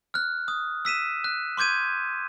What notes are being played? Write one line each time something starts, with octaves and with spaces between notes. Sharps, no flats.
F6 F#6
D#6
E6 B6 D#7 E7
F#6
C6 D6 G6 G#6 D#7